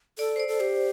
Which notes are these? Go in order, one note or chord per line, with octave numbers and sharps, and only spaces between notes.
A4 D5
C5
D5
A4
G4 C5